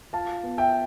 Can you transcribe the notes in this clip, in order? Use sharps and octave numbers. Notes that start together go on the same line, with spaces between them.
F4 F5 A5
B3
E5 G5